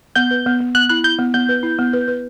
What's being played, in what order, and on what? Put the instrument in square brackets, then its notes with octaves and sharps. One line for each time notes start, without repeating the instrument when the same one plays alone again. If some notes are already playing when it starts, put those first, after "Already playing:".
[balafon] B3 [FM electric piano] G6
[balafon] B4
B3
B3
[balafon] B3 [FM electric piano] F#6
[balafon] E4 [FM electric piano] F#6
[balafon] E4 [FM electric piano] G6
[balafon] B3
[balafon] B3 [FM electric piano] G6
[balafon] B4
E4
B3
B4
B4